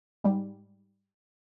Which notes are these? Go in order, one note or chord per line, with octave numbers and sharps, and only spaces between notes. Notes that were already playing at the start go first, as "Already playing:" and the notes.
G#2 G3